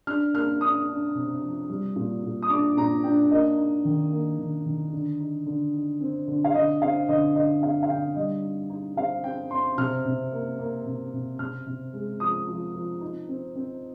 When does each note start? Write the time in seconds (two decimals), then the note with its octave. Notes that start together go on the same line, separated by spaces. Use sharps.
0.07 D4 F6
0.34 A#3 F6
0.61 D4 D#6
0.89 D4
1.15 C3
1.42 F3
1.70 G3
1.96 A#2
2.23 A#2
2.42 D#6
2.50 D4 D6
2.77 A#2 A#5
3.04 D4 G5
3.31 A#3 D#5
3.58 D#4
3.85 D#3
4.12 A#3
4.39 D#3
4.66 D#3
4.93 D3
5.20 D#4
5.46 D3
5.73 D#4
6.01 C4
6.27 D3
6.44 F5
6.54 D3 D#5
6.82 C4 F5
7.09 D3 D#5
7.35 D3 D#5
7.63 C4 F5
7.83 F5
7.89 D3 G5
8.16 G3 D#5
8.43 D#4
8.70 D#4
8.97 C4 F5
9.24 C4 G5
9.51 C4 C6
9.78 C3 F6
10.05 C3
10.32 A#3
10.59 A#3
10.85 C3
11.13 C3
11.39 C3 F6
11.66 C3
11.93 G#3
12.20 F3 D#6
12.48 F3
12.75 F3
13.01 D#4
13.29 C4
13.55 C4